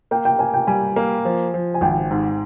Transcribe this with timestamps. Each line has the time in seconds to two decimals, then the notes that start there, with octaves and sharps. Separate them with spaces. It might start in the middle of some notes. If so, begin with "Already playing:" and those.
0.11 A#3 G5
0.25 G5
0.39 A#3 G#5
0.54 G5
0.67 G3 G#5
0.96 A#3
1.25 F3
1.54 F3
1.74 G#5
1.81 G#1 G5
2.10 G#2